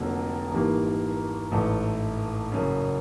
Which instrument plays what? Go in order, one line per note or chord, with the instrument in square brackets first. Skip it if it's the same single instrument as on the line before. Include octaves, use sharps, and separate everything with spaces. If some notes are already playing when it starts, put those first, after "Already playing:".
Already playing: [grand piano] F1 F2 D3 F#3 A#3
G#1 G#2 E3 G3 A#3
A1 G#2 E3 A3
F#1 F#2 C#3